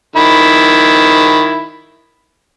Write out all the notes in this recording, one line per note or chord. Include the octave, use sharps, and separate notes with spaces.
D#3 E4